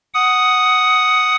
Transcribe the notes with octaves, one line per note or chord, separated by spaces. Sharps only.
F#5 D#6